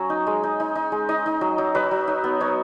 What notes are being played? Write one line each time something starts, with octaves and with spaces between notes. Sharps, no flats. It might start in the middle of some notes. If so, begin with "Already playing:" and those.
Already playing: F#3 C#4 G#5
D#4
G#3
D#4
D#4
D#4
G#3
D#4 D#5
D#4
F#3
F#3
F#3 B4
F#3
D#4
B3
D#4 C#5